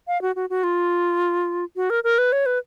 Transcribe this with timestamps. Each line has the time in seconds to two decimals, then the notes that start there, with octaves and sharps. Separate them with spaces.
0.08 F5
0.22 F#4
0.36 F#4
0.50 F#4
0.64 F4
1.76 F#4
1.90 A#4
2.04 A#4
2.18 B4
2.32 C#5
2.46 B4